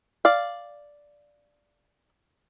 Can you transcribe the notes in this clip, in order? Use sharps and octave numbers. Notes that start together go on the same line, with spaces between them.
D5 F5